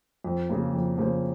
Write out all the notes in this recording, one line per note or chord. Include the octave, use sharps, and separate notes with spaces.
F2
C#3 F3 A#3
F2
C#3 F3 A#3